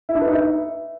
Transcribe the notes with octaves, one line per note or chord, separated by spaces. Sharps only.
E4
D4
B4
D#4
E5